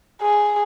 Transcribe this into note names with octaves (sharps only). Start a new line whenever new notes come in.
G#4